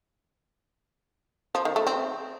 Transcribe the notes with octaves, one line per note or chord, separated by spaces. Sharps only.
F3
D#3
A3
C4